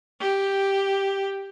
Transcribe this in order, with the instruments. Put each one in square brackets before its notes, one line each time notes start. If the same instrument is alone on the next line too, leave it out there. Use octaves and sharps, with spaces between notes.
[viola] G4